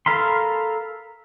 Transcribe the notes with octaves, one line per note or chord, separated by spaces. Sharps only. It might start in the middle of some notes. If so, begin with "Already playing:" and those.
A4 A#4 F5 B5 C6